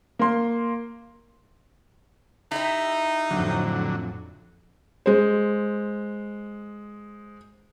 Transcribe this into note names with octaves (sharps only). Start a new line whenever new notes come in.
A#3 C6
D#4 E4 G4 E5
F2 A2 D3 F#3
G#3 C5